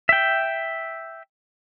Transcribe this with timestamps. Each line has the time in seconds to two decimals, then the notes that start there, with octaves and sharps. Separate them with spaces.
0.09 E5 G5